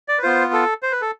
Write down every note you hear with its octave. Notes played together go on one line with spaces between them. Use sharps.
D5
B4
B3 F4 C5
A4
C5
B4
A4